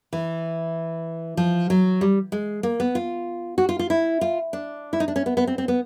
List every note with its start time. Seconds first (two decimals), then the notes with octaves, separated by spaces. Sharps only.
0.13 E3
1.37 F3
1.70 F#3
2.01 G3
2.32 G#3
2.63 A#3
2.80 B3
2.95 F4
3.58 F#4
3.69 F4
3.79 F4
3.90 E4
4.21 F4
4.53 D4
4.93 E4
5.00 D#4
5.08 D4
5.16 C#4
5.26 B3
5.37 B3
5.47 C4
5.58 C4
5.68 B3